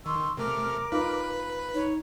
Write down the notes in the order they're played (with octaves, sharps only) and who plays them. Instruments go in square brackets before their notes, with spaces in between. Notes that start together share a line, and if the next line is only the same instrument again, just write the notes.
[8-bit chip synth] D#3 [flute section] C6 C#6 E6
[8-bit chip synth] C3 A3 F6 [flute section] A#4 D6
[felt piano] D#4 F4 [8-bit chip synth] B4 B5
[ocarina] D#4 [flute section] C#5